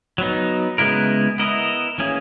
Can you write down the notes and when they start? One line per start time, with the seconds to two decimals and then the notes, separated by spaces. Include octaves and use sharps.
0.18 F#3 B3 D#4
0.78 C#3 G#3 B3 E4 A#4
1.38 B3 E4 A#4 D#5
1.98 E3 A#3 C#4 G#4